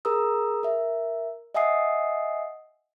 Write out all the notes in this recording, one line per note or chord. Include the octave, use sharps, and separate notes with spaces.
G#4 A#4 A#5 D#6 E6
A#4 E5
D#5 E5 F#5 G#5 D#6 C7